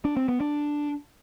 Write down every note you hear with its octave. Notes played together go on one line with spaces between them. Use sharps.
D4
C4
B3
D4